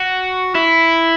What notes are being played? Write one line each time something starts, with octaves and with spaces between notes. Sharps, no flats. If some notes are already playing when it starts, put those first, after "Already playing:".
Already playing: F#4
E4